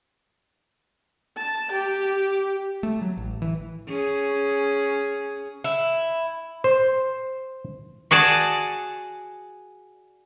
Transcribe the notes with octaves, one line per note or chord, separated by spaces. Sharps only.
A5
G4
A3
F#3
A1
E3
C#4 G#4
E4
C5
F#4 G#4 D5 A5